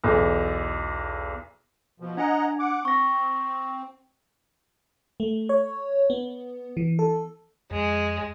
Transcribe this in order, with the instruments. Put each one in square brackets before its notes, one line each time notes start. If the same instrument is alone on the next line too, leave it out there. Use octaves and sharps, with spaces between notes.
[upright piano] B1 E2
[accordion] B2 F3
[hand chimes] D4 G#5 [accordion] D#5 F#5 A#5
[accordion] F#5 D6
[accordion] C4 [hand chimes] C#6 A#6
[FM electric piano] A3
C#5
B3
E3
A4
[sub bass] F2 [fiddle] G#3